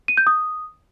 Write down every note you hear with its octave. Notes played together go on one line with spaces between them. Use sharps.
D#7
G6
D#6